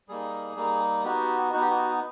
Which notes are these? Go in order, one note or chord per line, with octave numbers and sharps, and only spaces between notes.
G3 A#3 D#4 G#4
G3 A#3 D#4
B3 D#4 F#4 G4
B3 D#4 F#4
G4
F#4